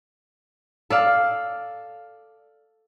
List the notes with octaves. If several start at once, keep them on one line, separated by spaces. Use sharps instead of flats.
A4 D5 F5